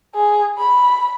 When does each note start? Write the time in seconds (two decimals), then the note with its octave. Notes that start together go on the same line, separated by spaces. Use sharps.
0.15 G#4
0.58 B5